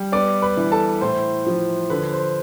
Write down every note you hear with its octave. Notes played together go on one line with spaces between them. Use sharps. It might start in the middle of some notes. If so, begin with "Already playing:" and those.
Already playing: G3
B3 D5 D6
B4 B5
E3
A4 A5
A2 C5
F3
D3 B4
C5